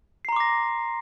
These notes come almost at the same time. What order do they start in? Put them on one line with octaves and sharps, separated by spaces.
C7 A#5 C6 D6 A#6